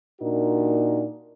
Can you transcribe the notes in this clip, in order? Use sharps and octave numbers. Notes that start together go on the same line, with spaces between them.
A#2 D4 D#4 F#4 A#4